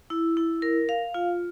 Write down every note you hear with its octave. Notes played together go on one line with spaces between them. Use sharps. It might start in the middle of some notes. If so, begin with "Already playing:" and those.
E4
E4
A#4
F5
F4